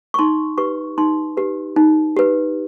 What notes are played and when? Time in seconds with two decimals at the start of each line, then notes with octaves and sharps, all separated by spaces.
0.14 C#6
0.19 D#4 C6
0.58 G4 B4 C#6
0.98 D#4 C6
1.37 G4 B4
1.76 D#4
2.17 G4 B4